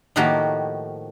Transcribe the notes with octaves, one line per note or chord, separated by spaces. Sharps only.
A2 D#3 F3 A#3 F#4 G4